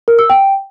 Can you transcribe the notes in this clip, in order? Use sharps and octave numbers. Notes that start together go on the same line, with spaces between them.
A#4
E6
G5